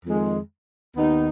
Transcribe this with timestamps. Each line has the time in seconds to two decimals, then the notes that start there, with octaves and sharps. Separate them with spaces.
0.05 F2 D#3 G#3
0.97 D#2 D#3 B3 D#4